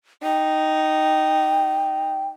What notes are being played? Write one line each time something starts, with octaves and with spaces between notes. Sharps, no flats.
D#4 G5